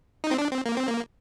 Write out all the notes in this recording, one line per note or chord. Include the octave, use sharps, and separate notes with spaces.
D#4
C4
D4
C4
A#3
C4
A#3